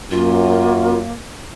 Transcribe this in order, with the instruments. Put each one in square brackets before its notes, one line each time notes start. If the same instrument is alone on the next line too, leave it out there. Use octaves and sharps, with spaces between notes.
[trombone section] F#2 [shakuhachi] A#3 [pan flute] F4